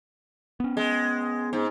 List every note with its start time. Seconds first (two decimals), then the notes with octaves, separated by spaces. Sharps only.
0.60 B3 C#4
0.77 G#3
1.53 G#2